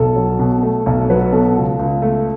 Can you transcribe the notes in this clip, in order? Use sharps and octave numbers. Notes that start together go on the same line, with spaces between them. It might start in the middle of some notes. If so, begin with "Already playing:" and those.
Already playing: B1 A4
F#3
B2
A3
B1
F#3 B4
B2 A4
C#2
C#2
A3